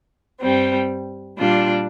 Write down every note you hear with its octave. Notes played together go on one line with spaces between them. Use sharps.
G2 G3 C4
A#2 G3 D4 F4